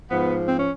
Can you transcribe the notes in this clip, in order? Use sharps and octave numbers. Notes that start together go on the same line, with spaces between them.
G#2 F3 B3
C4
C#4